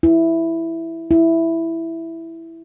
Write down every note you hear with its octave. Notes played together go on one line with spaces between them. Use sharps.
E4
E4